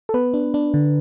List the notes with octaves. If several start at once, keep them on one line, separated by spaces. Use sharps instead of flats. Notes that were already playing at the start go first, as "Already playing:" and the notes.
A4
B3 B4
D4
D4
D3